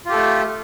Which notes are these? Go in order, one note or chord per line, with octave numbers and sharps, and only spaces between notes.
A3 F4 G4 A4